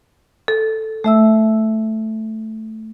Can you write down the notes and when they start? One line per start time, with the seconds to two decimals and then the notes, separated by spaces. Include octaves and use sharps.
0.48 A4
1.04 A3 E5 E6